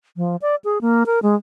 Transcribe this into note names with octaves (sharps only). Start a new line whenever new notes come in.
F3
D5
G#4
A#3
A#4
G#3